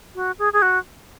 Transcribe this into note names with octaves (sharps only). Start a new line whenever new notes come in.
F#4
G#4
G#4
F#4